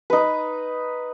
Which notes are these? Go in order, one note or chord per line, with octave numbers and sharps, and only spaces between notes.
D#4 B4